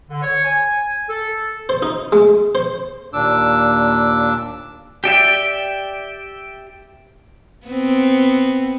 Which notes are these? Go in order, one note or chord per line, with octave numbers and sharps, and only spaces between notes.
D3
C#5
G#5
A4
C5
D#4
G#3
C5
D#2 A#2 D4 D6 E6
G4 D5 E5 G5
B3 C4